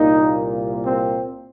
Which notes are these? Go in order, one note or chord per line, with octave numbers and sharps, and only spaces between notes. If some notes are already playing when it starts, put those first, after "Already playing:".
Already playing: C2 A#2 A#3 D#4
C4